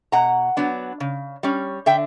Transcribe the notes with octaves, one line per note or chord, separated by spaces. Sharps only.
B2 F#5 A#5
F#3 B3 D4
C#3
G3 C#4
D3 E5 G5